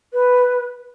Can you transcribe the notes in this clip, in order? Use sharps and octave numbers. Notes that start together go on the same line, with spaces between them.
B4